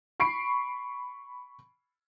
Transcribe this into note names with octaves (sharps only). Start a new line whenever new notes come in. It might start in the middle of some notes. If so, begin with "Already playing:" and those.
B5 C#6 C7 D7